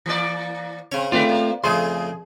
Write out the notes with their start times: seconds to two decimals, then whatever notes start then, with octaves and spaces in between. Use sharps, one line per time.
0.06 E3 A#3 D5
0.92 C#3 C4 C#5
1.12 D3 A3 C4 F4 B4 D5
1.29 A#3
1.64 F2 C#3 A3 G#4 C6